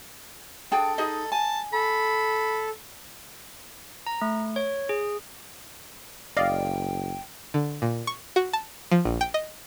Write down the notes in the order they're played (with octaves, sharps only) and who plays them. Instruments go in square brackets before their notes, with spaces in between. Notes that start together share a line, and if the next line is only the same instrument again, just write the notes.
[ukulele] D4 G#4 G5 [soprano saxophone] A4
[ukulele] D#4 G#4 D#5
[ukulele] G#5 [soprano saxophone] A5
[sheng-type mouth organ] A4 [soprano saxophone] B5
[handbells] A#5
A3
C#5
G#4
[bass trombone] F#1 [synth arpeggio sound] D5 D#5 F5 [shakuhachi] G5
[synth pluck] D3
A#2
C#6
F#4
A5
F3
A#1
G5
D#5